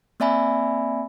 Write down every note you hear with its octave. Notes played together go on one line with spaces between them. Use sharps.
A#3 C4 D5 E5 G#5 B5